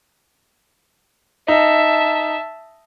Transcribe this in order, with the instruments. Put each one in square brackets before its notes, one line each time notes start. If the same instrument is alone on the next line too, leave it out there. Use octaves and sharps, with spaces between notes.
[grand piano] D#4 [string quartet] E5 A5